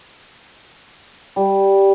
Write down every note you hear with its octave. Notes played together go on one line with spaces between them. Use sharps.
G3